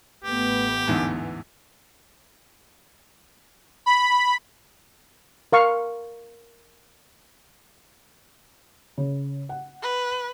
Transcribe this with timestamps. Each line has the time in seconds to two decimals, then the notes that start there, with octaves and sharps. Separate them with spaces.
0.24 A1 A3 B3 G4
0.88 E2 G#2 D3
3.86 B5
5.52 A#4 F5 C#6
8.98 C#3
9.49 F#5
9.82 B4